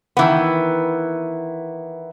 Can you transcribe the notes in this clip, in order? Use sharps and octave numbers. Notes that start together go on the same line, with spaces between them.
D#3 E3 B3